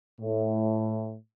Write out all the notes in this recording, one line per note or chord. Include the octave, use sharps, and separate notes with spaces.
A2